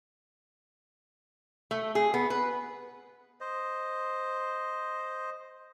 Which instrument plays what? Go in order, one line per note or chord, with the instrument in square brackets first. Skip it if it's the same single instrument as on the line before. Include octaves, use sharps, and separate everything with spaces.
[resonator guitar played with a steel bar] A3
G#4
B3
B4
[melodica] C5 D#5